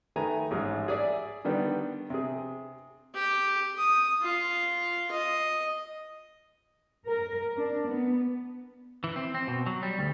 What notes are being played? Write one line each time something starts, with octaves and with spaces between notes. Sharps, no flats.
D#3 A3 B4 G#5 A#5
A1 G#2 G#4
G#4 D5 E5
D3 D#3 G3 B3
C3 G#4
G4
D#6
F4
D#5
A#4
D4
B3
E3
C4
C4
B2
F#3
G3
D2